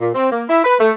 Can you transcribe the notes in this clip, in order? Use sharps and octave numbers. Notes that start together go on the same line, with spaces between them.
A#2
C4
A#3
E4
B4
A3